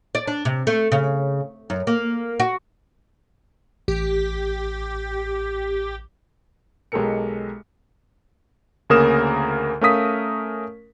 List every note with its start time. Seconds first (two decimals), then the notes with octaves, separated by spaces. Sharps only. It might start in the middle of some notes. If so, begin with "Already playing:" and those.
0.15 D5
0.27 D4
0.45 C3
0.67 A3
0.92 C#3
1.70 F#2
1.87 A#3
2.40 F#4
3.88 A1 G4
6.92 B1 G#3 G4 A4 A#4 C#7
8.90 D2 C#3 A#3 A#4 D#6 E7
9.81 A3 C#4 A#4 F5 D#6 B6